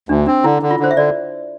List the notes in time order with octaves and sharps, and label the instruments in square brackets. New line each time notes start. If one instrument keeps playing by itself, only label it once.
[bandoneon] D2 [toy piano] D4
[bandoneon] C4 [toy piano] D4
[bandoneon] D3 [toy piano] E4
[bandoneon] D3
[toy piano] F4
[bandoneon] D3 [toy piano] C5
[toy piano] E5
[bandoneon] D3 [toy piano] D5